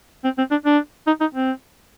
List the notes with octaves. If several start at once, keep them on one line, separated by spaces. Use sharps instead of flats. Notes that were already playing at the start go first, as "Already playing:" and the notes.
C4
C4
D4
D4
D#4
D#4
C4